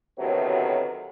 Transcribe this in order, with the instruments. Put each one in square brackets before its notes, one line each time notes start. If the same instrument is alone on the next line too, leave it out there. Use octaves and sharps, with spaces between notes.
[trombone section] D2 A2 C3 D#3 F#3 B3